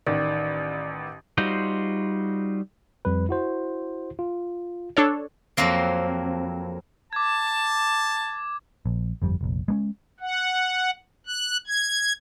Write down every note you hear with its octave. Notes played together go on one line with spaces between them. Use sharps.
A1 D#3 D5
G3 D#4 F4 F#4 C5
F2 G3 B4
E4 F#4 C5
F4
D4 A4 C#5
F2 F#3 A#3 C4
A5 D6 G#6
A#1
G1 F2 G3
F1 A#1
G#3 A#3 C#4
F#5
F#6
G#6